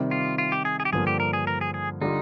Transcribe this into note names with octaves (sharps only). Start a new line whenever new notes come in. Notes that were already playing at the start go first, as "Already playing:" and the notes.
Already playing: C3 D#3 G3 C4
F4
F4
G4
G#4
G#4
G4
G2 D3 F3 A#3 G#4
G4
A#4
G#4
A#4
G#4
G#4
D3 G3 D4 D#4 F4